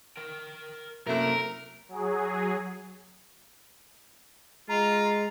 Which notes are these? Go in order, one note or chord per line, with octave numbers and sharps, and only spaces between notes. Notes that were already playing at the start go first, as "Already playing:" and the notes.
A#4 G5
F#2 C3 A3 A#3 E4 A#4
F#3 G#4
G#3 F4 A#5